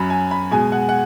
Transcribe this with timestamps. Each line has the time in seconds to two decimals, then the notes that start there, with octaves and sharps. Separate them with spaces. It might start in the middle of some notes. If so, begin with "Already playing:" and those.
Already playing: F#2 F#3 B5
0.10 G#5
0.31 B5
0.51 B2 G#3 G#5
0.72 F#5
0.89 F#5